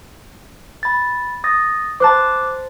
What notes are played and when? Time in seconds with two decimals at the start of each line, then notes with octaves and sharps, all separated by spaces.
0.83 B5 A6
1.44 D#6 A6 A#6
2.00 C5 A5 D6 F#6